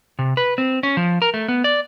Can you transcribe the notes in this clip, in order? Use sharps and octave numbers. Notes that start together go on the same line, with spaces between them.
C3
B4
C4
C#4
F3
A#4
A3
B3
D5